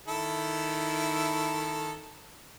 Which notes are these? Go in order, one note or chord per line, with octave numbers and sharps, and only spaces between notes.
D#3 E4 A4